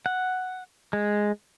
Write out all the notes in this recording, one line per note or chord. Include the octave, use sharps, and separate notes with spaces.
F#5
G#3